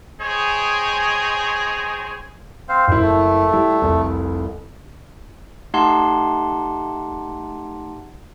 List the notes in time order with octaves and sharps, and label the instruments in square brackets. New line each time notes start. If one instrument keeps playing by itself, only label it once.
[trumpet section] G#4 C5 C#5 D#5 G5 G#5
[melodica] C4 C5 F5
[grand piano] F#1 E4 [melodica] C5
[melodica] A3
[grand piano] G3 E4
F1 C2
[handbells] A3 D#4 G4 F#5 A5 C6